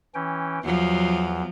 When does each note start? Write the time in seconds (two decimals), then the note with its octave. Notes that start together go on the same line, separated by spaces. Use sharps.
0.15 E3 C#4 G5
0.63 E2 F3 F#3